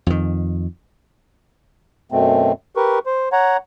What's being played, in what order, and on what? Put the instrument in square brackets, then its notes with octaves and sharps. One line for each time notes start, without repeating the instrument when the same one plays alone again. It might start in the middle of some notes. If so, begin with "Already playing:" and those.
[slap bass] F2 D#3
[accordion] F#2 B2 A3 C4
G4 A#4 B4 C#6
C5
C#5 F#5 A#5